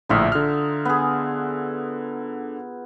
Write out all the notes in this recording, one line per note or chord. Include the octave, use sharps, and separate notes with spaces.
A#1 A2 D3 D#4 F4 E5
D3 F6
B3 G#4